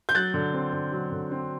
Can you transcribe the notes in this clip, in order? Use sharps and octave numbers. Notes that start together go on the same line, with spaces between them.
G6
F#3 F#6 A6
D3
C4
D3
F#3
D3
C4